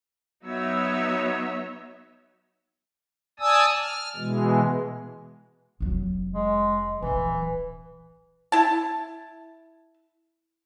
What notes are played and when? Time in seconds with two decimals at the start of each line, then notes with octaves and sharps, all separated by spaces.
0.43 F#3 B3 D#4 C#5 E5
3.40 D5 G#5 A5 D#6 E6
3.80 F6
4.16 B2 E3 G#3
5.80 F1 F#3
6.34 G#3
7.02 D1 A#1 E3
8.52 E4 A5